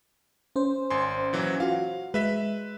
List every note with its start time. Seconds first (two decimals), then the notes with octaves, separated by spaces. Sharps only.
0.56 C#4 C5
0.90 G#1 G#5 C6
1.33 A#2 E3 F#3
1.60 F4 F#4 F5
2.14 G#3 B4 E5 B6